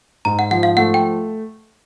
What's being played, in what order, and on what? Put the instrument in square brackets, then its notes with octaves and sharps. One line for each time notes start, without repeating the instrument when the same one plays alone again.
[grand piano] G#2 [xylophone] A#5
[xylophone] F#5
[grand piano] F3 [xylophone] F#5
[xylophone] F5
[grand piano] A3 [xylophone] F#5
[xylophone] G5